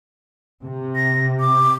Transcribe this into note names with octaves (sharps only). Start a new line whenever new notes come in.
C3
A#6
D6